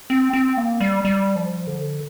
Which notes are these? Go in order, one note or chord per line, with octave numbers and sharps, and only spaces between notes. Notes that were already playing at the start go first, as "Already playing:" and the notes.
C4
C4
A#3
G3
G3
F3
D3